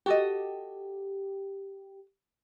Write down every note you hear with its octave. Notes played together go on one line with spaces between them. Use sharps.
F#4 G4 A4 D#5